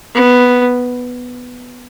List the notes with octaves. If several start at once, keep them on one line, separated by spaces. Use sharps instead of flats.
B3